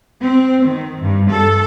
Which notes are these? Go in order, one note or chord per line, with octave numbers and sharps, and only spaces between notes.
C4
D#3
G2
A4